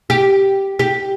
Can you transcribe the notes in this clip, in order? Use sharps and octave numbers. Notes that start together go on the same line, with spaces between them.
G4
G4